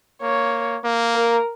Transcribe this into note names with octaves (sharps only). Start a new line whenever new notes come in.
A#3 C#5
A#3
A#4